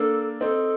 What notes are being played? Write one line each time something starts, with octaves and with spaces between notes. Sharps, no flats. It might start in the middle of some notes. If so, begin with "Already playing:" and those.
Already playing: A#3 D4 A4
C4 D#4 A4